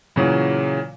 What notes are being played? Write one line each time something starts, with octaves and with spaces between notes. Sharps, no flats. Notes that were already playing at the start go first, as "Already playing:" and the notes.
A#2 C#3 E3 F#3